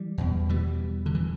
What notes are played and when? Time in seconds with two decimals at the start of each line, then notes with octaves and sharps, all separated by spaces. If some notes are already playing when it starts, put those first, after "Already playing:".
Already playing: E3 G3
0.18 E2 B2
0.49 E3 G3
1.06 D3
1.15 E3